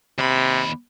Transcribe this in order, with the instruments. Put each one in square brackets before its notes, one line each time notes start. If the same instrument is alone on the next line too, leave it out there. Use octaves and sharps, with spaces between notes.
[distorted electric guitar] D#2 B5 [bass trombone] C3